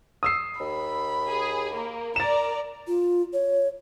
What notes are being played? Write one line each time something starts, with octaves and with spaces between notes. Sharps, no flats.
D#6 E6 C7
D#2 B5
G#4
A#3
A#4 D5 A#5 A6 E7
F4
C#5